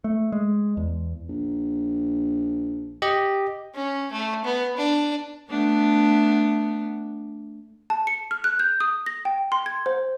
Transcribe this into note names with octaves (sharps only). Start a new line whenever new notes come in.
A3
G#3
E2
A#1
G4 D#5
C#4
A3
B3
D4
A3 B3 D4
A5
C#7
F6
F#6
G6
D#6
A#6
G5
C6
G#6
C5